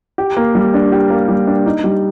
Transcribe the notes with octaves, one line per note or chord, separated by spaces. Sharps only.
G4
A#3
G3
D4
G4
A#3
G3
D4
D#4
G3